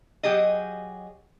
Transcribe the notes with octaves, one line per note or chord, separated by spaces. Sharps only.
F#3 G4 G#4 D#5